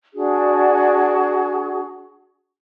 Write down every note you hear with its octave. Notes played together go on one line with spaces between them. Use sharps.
D4 F#4 G#4